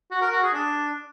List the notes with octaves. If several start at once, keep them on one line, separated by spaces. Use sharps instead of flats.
F#4
A#4
F#4
G#4
D4